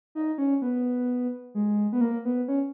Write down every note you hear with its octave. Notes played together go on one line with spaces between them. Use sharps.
D#4
C#4
B3
G#3
B3
A#3
B3
C#4